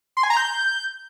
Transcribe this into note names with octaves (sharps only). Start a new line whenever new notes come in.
C6
G#5
A#5
G6